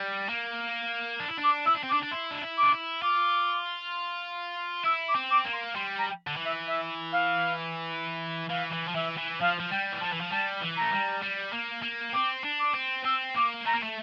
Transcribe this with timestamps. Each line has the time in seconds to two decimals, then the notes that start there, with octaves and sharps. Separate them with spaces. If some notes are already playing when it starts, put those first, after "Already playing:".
Already playing: G3
0.29 A#3
1.20 D4
1.28 E4
1.37 D4
1.43 D6
1.65 E4 E6
1.75 D4
1.83 C4
1.89 D6
1.93 D4
2.03 D4
2.11 E4 C6
2.31 D4
2.41 E4
2.57 D6
2.63 D4
2.71 E4
3.02 F4 D6
4.84 E4 E6
5.08 D6
5.15 C4
5.30 D6
5.45 A#3
5.53 C6
5.75 G3 C6
5.98 A#5
6.27 D3
6.36 E3
6.44 E5
6.67 E5
7.12 F5
8.49 E3 F5
8.72 E3
8.88 F3
8.94 E3 E5
9.17 E3
9.40 F3 F5
9.60 F3
9.70 G3 G5
9.92 E3
10.01 F3 A5
10.13 E3
10.21 F3
10.31 G3 A5
10.62 E3
10.76 A3 A#5
10.92 G3
11.23 G3
11.53 A#3
11.83 A#3
12.13 C4 D6
12.44 D4
12.59 D6
12.74 C4
13.05 C4 E6
13.34 A#3 D6
13.66 A3 A#5
13.74 A#3
13.83 A3